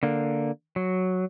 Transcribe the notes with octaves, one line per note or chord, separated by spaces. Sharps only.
D3 A#3
F#3